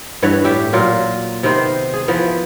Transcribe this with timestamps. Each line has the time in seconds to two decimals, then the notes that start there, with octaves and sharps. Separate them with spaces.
0.22 G2 E3 C#5 F#5
0.44 A2 G4 E5
0.73 A#2 F#3 F4
1.43 C3 D#3 B3 C5
1.93 G#4
2.08 E3 F3 B3